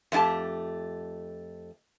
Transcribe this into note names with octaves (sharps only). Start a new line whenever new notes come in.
F2 A3 E4 G4 A5